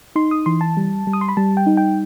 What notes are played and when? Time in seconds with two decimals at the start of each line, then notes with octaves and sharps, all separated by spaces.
0.16 D#4 C6
0.31 D#6
0.46 E3 C6
0.61 A5
0.77 G3
1.07 G3
1.13 D#6
1.21 C6
1.28 B5
1.37 G3 A5
1.57 G5
1.66 D#4
1.77 G5